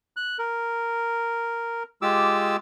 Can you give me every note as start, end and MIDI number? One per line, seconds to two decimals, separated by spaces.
0.17 0.38 90
0.39 1.83 70
2.02 2.56 56
2.02 2.56 65
2.02 2.56 67
2.02 2.56 86
2.02 2.56 88